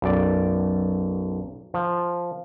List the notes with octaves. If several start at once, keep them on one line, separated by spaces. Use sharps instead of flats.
B1 F#2 D5
F3